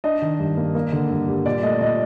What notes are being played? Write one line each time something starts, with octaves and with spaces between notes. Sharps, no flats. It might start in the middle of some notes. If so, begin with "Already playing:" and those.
D4 D#5
D#3
G2
A#3
A#3
D3
G2
G3
A#2 D5
A3 D#5
A#2 D#5